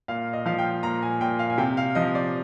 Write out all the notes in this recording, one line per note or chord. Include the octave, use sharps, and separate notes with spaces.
A#2 F5
D#5
F3 F5
G5
A#2 A#5
G#5
A#2 G5
F5
G#5
C3 G5
F5
F3 D#5
D5